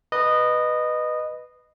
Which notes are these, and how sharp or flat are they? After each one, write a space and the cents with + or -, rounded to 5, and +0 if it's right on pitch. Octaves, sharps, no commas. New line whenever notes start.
B4 +0 D#5 -15